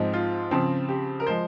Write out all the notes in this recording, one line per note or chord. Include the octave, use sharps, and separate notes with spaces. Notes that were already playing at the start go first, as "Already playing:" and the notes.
Already playing: G#2 F3 G#3 C4
F4
C#3 F3 C4
G4
A#4
F3 G#3 C5